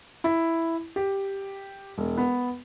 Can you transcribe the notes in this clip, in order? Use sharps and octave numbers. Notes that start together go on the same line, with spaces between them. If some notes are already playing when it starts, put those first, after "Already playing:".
E4
G4
E1
B3